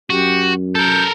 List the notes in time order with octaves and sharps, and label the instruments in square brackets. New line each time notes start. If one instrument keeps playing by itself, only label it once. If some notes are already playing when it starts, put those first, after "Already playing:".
[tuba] F#2 [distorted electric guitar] F#4 [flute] G4
[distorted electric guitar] A4 A#4 [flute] G6